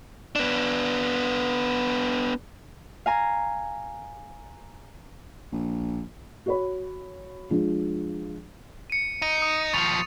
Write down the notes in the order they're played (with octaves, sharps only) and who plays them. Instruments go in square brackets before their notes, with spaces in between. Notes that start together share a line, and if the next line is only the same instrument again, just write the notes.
[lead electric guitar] B3 D4
[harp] F5 G#5 A#5
[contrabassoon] A#1
[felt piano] F#4 C#5 B5
F3 G#3 D4
[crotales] C#7 D#7
[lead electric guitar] D#4 [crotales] D#7
[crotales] D#6
[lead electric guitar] D#2 F3 [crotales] C#6 A6 F7